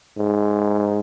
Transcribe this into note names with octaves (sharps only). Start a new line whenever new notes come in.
G#2